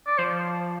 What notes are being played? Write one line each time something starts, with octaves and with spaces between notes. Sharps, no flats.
D5
F3 C5